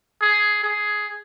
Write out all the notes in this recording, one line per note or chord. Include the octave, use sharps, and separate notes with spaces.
G#4
G#4